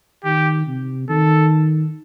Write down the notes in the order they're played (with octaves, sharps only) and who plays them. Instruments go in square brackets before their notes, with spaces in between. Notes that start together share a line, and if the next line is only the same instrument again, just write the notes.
[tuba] D#3 [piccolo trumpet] G4
[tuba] C3
[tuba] D#3 [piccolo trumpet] A4